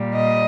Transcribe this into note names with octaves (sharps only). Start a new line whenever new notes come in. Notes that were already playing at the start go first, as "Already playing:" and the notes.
Already playing: A#2 G3
D#5